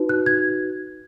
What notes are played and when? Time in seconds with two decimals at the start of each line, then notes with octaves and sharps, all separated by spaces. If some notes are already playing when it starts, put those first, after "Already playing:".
Already playing: D#4 F#4 B4
0.09 F#6
0.26 G#6